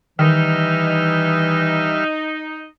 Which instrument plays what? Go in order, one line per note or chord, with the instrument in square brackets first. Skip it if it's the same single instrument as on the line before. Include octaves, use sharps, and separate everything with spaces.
[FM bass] D#3 [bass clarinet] E3 [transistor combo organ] G3 E5 F6 [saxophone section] D#4